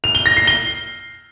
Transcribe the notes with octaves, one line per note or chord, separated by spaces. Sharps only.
F7
G7
A#6
C7
G7